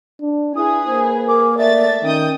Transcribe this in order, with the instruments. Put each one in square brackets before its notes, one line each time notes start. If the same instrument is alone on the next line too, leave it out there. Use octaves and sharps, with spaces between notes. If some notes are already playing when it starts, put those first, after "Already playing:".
[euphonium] D4
[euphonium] E4 [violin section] G#4 B4 [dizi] D#6
[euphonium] A#3 [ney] C5
[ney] A#4 [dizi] D6
[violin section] A3 A6 [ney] D5 [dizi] E5
[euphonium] D#3 [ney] C#4 [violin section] G5 D#6 G6